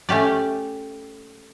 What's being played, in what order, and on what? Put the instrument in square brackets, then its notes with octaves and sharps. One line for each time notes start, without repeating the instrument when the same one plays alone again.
[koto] A3 C#4 G4 D5